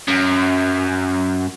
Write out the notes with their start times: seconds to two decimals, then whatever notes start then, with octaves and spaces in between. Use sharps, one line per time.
0.08 F#2